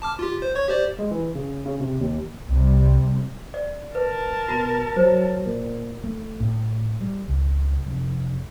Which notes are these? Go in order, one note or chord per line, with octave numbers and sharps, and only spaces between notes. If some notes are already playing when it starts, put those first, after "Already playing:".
A5 D6 F6
F4 G4
C5
C#5 C#6 G#6
G4 C5 D5
G#3
E3
C#3
C#3
C3
D#2
C2 C3 G3
D5
A#4 B4 A5
B2 F#4 A#5
F#3 C5
A#2
A3
A2
G3
C#2
F1